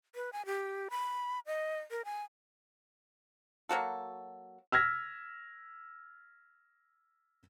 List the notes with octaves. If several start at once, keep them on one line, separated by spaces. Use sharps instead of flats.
B4
G#5
G4
B5
D#5
A#4
G#5
F#3 A#3 F#4 A4
E6 F6 G#6 A#6 B6